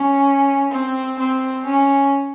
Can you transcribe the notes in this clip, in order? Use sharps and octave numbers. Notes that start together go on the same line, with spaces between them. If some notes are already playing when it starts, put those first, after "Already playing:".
Already playing: C#4
C4
C4
C#4